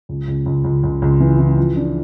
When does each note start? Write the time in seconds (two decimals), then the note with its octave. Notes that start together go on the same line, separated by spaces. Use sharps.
0.09 C#2
0.28 C#2
0.46 C#2
0.64 C#2
0.83 C#2
1.02 C#2
1.20 E3
1.39 E3
1.58 F3
1.76 D4